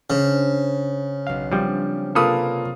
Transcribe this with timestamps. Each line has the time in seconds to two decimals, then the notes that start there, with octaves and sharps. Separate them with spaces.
0.10 C#3 D4 C5
1.27 B1 F#3 F5 C7
1.52 F3 G3 C4 D4
2.15 C3 A#3 F4 G#4 A4 B4 D#6